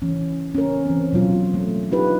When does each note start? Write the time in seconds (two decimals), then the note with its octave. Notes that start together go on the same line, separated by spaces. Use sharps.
0.02 E3 C#4
0.54 C#4 A#4
0.86 E3 C4
1.13 B2 F#3 F4
1.54 A3
1.91 D4 D#4 F4 G4 B4